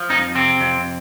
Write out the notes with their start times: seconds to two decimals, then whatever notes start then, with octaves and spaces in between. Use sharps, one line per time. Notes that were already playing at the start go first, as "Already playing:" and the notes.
Already playing: F3
0.10 F2 D#4
0.35 C3 C4
0.61 F2